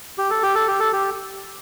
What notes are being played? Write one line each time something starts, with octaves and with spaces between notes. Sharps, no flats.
G4
A4
G4
A4
G4
A4
G4